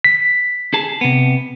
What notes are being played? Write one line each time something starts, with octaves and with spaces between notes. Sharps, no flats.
B6
G#4 A5
C3 B3